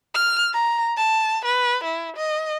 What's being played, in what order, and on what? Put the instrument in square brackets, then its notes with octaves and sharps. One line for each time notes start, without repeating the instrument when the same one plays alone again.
[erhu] F6
A#5
A5
B4
E4
D#5